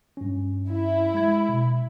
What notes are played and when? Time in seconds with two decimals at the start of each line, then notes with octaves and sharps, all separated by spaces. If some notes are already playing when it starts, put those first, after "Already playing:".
0.17 G2 C#4
0.69 E4
1.14 G#3 G#6
1.49 B2